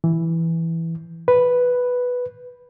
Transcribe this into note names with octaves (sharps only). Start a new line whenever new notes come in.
E3
B4